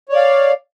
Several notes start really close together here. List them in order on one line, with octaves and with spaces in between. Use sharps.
C#5 D5 F5